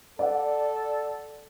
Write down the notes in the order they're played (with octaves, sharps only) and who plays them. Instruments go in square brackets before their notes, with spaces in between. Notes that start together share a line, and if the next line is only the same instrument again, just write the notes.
[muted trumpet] A4 [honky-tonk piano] D5 F#5